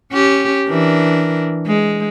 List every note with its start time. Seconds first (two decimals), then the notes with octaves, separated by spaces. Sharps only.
0.12 C#4 G4
0.68 E3 D4 A#4
1.67 G#3